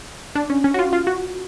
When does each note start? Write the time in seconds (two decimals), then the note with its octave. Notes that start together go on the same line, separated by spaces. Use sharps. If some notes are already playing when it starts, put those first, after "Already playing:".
0.35 D4
0.50 C#4
0.64 C#4
0.74 F#4
0.79 F4
0.93 F4
1.07 F#4